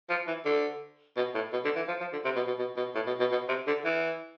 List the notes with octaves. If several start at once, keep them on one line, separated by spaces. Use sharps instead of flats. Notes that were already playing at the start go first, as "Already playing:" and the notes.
F3
E3
D3
B2
A2
B2
D3
E3
F3
F3
D3
C3
B2
B2
B2
B2
A2
B2
B2
B2
C3
D3
E3